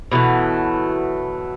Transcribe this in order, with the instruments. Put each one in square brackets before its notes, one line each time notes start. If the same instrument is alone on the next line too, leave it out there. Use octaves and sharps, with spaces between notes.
[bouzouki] B2 E3 F#3 A3